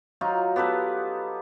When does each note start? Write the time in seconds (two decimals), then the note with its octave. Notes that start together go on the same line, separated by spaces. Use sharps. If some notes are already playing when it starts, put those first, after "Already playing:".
0.21 F#3 D#4 F4
0.56 B3 G4 A4 B4